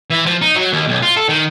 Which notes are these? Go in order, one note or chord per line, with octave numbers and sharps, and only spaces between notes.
E3
F3
D#4
F#3
D#2
B1
F4
A4
D#3